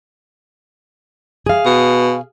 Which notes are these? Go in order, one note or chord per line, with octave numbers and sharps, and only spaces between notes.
G#4 F5
B2